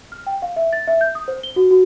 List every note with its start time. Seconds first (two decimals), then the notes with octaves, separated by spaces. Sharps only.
0.12 F6
0.27 G5
0.42 F5
0.56 E5
0.73 A6
0.88 E5
1.01 G6
1.15 D#6
1.28 C5
1.43 G7
1.56 F#4
1.71 F#4